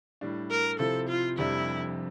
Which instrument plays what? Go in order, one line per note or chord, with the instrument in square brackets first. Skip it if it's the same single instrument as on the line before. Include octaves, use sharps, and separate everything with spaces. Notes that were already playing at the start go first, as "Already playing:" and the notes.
[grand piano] A2 G3 D4
[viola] A#4
[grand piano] C3 F3 C4 E4 [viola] A4
[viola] F4
[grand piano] F1 F2 C3 G3 D4 [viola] E4